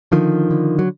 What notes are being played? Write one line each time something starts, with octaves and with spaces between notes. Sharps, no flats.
D3 D#3 F3
D3
F#3